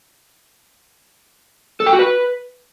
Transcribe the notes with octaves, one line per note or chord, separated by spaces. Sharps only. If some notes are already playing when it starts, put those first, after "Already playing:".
A4
G5
F#4
B4